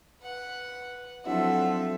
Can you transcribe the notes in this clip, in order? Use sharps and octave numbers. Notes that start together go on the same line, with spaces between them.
B4 F#5
F3 F#3 C4 D4 E4 A4 E5 F#5